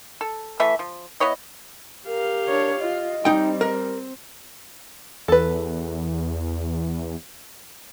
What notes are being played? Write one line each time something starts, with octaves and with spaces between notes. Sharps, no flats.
A4
E3 A3 E5
F3
B3 E4 C#5 D#5
G4 A#4 F5
D4 C#5
F4 D#5
G3 C4 D#4 G5
A#4
E2 A4 B4